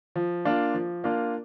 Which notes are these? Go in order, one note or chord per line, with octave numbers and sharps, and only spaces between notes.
F3
A#3 D4 F4
F3
A#3 D4 F4